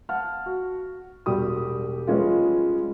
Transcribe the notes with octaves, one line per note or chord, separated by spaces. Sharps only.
F5 F#5 A5 F6
F#4
E1 G3 F#4 G4 D#6
F3 G3 G#3 B3 C#4 F4